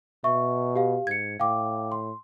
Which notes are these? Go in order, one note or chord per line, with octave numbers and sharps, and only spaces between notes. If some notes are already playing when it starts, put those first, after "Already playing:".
B2 E5 C#6
G4 F5
G#2 G#6 C#7
A2 F5 G5 D6
C6